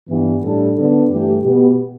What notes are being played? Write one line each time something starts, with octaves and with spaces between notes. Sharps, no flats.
G2 E3 B3
A2 G3 D4 A4
D3 B3 D4 A4
G2 E3 A3 G4
B2 B3 G4